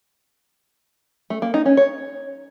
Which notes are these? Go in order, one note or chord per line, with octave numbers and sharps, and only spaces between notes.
A3
A#3
D#4
C#4
C#5